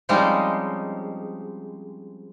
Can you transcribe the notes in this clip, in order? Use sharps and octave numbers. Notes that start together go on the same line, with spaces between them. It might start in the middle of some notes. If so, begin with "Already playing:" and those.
F3 G3 G#3 C4 C#4 D#4